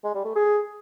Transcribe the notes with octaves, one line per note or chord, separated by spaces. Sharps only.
G#3
G3
A3
G#4